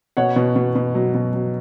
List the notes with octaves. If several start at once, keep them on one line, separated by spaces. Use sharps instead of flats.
B2 C#5 F#5
B2
B2
B2
F#3
B2
F#3